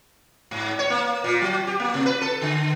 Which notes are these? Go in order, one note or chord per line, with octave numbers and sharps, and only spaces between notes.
G#2
C#5
A#3
A#2
F#3
G4
A#3
C3
B4
A4
D3